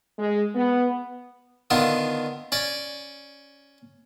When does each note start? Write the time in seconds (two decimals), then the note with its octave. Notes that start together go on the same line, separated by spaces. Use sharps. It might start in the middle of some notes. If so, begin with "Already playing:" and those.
0.19 G#3
0.54 B3
1.70 D3 D#3 B3 F4
2.52 C#4 D5